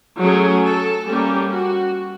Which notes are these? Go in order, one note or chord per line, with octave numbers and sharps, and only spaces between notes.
F#3 A3 C#4 G#4
A4
G3 A#3 C#4 G4
F#4